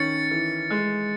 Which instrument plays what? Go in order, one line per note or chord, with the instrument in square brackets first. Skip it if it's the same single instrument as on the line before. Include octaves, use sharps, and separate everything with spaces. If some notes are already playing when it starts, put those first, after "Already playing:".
Already playing: [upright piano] D#3 C#4 [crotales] A6 C#7
[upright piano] E3
G#3